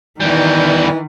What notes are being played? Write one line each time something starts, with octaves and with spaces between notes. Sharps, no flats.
E2 D#3 E3 G3